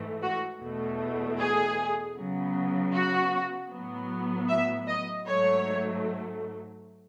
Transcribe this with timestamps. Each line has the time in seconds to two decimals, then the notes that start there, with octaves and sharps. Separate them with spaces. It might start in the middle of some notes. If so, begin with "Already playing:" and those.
Already playing: G#2 E3 A3
0.23 F#4
0.61 E2 B2 A3
1.39 G#4
2.16 C#3 F#3 B3
2.94 F#4
3.72 A2 F#3 B3
4.49 E5
4.88 D#5
5.27 G#2 F#3 A3 C#5